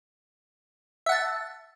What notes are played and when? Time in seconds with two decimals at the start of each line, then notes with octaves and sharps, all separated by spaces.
1.06 E5
1.09 F#5
1.12 A5